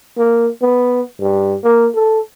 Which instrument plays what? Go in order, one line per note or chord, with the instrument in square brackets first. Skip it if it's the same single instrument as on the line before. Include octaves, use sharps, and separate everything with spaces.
[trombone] A#3
B3
G2
A#3
A4